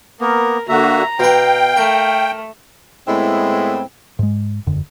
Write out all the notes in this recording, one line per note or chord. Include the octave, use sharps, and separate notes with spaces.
A#3 B3 A#4
D3 A#3 F#4 E5 A#5
B2 B4 F5 G5
A3 A#4
A2 G#3 B3 C4 E4
G#2 G#3
E1 F#2 D3